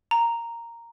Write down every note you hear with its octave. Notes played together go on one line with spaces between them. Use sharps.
A#5